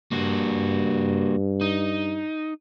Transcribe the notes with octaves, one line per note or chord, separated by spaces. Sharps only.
G2 A#3 F#4
D#4